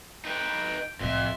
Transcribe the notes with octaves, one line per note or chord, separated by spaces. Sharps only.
D#4 B4 G5
C2 F2 A2 E5 C6